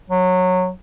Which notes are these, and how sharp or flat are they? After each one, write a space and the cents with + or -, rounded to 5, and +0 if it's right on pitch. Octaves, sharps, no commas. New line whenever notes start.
F#3 -15